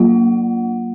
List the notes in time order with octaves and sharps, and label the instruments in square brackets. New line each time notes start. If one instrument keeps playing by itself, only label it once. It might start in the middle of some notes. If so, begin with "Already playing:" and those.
Already playing: [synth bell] F#3 A#3 F4 F#5